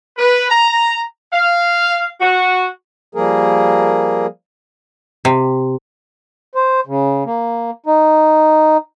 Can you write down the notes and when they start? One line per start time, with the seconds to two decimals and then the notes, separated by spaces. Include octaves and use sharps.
0.17 B4
0.50 A#5
1.32 F5
2.21 F#4
3.15 F3 G3 A#3 G#4 A#4
5.25 C3
6.55 C5
6.87 C#3
7.26 A#3
7.86 D#4